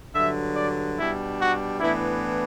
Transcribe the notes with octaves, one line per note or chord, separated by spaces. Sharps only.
G2 D3 F#3 E5
D5
B2 G3 D4 E4
F#4
A2 E3 B3 D4 E4